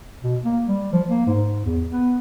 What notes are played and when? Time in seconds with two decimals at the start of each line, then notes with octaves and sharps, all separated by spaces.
0.23 B2
0.44 A#3
0.68 G3
0.93 F3
1.09 A#3
1.27 G#2
1.65 E2
1.91 B3